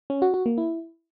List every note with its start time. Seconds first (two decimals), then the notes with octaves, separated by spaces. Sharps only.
0.10 C#4
0.22 F#4
0.34 F#4
0.46 A#3
0.58 E4